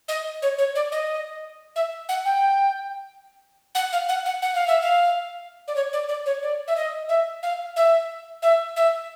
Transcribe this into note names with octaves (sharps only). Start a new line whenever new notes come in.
D#5
C#5
C#5
D5
D#5
E5
F#5
G5
F#5
F5
F#5
F#5
F#5
F5
E5
F5
D5
C#5
D5
D5
C#5
D5
E5
D#5
E5
F5
E5
E5
E5